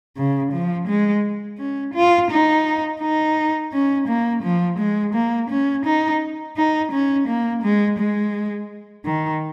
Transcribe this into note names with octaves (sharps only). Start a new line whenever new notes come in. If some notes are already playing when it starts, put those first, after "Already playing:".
C#3
F3
G#3
C#4
F4
D#4
D#4
C#4
A#3
F3
G#3
A#3
C#4
D#4
D#4
C#4
A#3
G#3
G#3
D#3